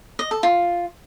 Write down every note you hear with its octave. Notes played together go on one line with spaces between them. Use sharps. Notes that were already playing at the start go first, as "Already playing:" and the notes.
D#5
A4
F4